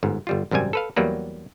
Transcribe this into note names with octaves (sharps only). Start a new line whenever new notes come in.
G1 G#2
G1 G3 F4
G#1 F#2 C3 G3 G#5
A4 B4 F5
E2 F#3 G3 A#3 B4